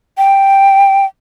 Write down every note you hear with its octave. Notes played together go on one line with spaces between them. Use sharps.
G5